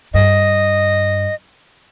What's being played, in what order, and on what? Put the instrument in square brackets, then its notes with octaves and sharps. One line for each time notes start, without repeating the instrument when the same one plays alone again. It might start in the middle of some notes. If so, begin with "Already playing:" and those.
[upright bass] G2 [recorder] D#5